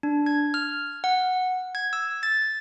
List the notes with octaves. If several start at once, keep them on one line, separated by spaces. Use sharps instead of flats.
D4
G#6
F6
F#5
G#6
E6
A6